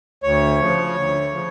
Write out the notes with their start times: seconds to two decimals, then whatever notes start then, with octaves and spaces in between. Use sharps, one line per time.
0.23 D2 C#5
0.60 C#3 F3
0.97 D2
1.33 C#3 F3